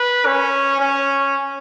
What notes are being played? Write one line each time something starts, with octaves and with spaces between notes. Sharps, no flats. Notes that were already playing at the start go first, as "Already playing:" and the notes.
Already playing: B4
C#4
C#4